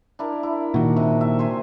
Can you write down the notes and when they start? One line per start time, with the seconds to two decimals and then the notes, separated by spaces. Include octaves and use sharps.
0.19 D4 E4 A#4
0.43 E4
0.74 A#2 D#3 F#4
0.96 C3
1.21 E5
1.39 C5 E5 G#5